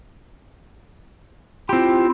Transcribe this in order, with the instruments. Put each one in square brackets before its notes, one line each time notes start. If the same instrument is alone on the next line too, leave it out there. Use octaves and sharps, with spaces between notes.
[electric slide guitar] C4 G4 [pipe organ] E4 F4